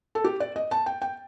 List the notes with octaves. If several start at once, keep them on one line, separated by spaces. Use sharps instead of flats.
A4
G4
D5
D#5
A5
G5
G5